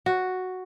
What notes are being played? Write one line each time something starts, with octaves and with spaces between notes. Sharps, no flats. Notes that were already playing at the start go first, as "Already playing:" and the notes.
F#4